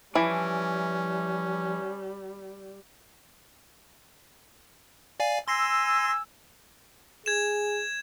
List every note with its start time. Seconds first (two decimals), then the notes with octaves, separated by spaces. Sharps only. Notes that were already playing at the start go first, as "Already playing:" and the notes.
0.15 E3 F3 G3 C#4 E4 D5
5.20 D5 F5 G#5
5.48 G#5 C6 E6 A#6 C7
7.26 G#4 G#6 E7